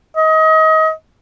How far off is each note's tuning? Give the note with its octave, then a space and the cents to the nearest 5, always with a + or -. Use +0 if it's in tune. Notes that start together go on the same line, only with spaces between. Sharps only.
D#5 +30